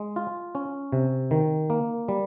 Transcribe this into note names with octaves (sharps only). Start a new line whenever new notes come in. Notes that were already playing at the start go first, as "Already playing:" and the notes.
Already playing: G#3
F4
C#4
C3
D#3
A#3
G3